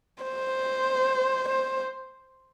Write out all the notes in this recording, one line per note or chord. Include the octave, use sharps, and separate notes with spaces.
C5
C5